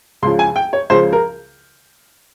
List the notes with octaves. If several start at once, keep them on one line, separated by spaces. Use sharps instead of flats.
C#2 C#3 F3 C6
G#5
G5
C#5
C#2 C#3 F3 C5
A#4